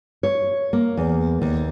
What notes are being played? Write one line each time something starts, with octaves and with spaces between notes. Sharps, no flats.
C#5
A#3
E2
D#2